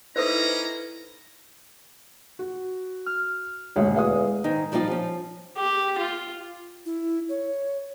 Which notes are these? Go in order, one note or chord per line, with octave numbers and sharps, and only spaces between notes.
A#3 C#4 D#4 E4 A4 B4 C5 A#5
F#4
F6
D#1 D2 F#3 G#3
E2 F5 D#6
G#2 D#3 D#4
F3 G3 D#4 F4 D5
F3 C#4
G4
F4
E4
C#5